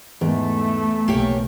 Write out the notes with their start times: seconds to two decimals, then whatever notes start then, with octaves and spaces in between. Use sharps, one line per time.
0.21 E2 G#2 A3
1.08 B1 C#3 A#3 G4 C#5